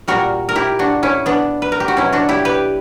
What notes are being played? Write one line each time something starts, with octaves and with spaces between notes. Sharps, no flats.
A#2 G3 F#4 A#4
A#4
E4 G4
D4 F#4
C#4 E4
B3 D4
B4
A#4
G4
F#4
B2 F#3 C#4 E4
D4 F#4
E4 G4
G4 B4